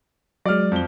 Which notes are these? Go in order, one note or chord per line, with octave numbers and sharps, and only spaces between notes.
F#3 G#3 D5 F6
F2 G7